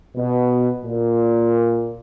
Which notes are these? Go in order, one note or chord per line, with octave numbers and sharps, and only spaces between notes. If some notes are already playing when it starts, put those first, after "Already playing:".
B2
A#2